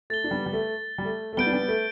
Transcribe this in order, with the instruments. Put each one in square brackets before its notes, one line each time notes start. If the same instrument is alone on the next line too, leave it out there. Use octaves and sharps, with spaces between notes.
[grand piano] A3 [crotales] A6 G7
[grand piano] D4
G3 B3
G3
A3
G3
A3
A3
[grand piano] G3 B3 [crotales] G6 D7 G7
[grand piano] D4
G3 B3
A3